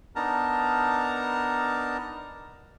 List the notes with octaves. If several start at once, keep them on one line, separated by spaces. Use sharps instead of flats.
B3 D4 D#4 A#4 A5 A#5